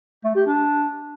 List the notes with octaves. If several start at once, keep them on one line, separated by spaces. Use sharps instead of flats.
A3
G4
D4